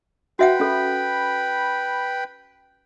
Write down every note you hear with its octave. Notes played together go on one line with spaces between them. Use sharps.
F#4 B4 E5 F#5 G5 B5
C#4 A4